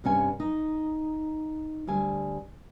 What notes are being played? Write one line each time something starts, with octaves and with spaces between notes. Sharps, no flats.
G2 C3 C#4 G#5
D#4
D2 G3 G#5